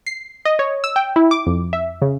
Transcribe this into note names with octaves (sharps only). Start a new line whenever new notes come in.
C7
D#5
C#5
E6
G5
E4
D6
F2
E5
C#3